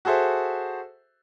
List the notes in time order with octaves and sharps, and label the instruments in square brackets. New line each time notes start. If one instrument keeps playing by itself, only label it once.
[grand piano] F#4 G#4 A4 C5 E5